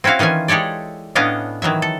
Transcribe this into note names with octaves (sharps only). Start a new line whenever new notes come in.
C4 C#4 E4 F#4 F5
D#3 E3 C#4 F4 G#5
G#3 G4 A4 C#5 D5
A2 B3 C#4 D4 D#5 F5
D#3 E3 F#3 E5
A4